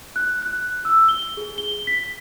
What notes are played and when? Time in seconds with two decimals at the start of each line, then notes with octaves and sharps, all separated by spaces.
0.16 F#6
0.42 F#6
0.85 E6
1.09 G7
1.37 G#4
1.58 G7
1.87 B6